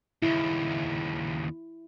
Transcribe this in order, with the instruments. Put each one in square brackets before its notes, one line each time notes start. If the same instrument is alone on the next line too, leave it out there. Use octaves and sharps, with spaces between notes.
[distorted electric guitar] D#2 C#3 [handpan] E4